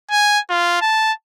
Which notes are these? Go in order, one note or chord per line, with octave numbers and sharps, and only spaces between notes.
G#5
F4
A5